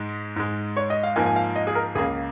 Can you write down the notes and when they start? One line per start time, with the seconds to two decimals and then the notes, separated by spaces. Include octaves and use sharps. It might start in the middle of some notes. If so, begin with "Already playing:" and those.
Already playing: G#2 G#3
0.36 G#2 G#3
0.77 C#5
0.90 D#5
1.03 F5
1.16 G#2 F3 A#3 G#5
1.26 G#5
1.36 F5
1.56 D#5
1.67 G#4
1.75 A#4
1.95 C#2 C#3 A#3 G#4